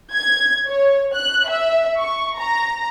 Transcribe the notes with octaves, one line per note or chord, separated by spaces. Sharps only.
G#6
C#5
F#6
E5
C#6
A#5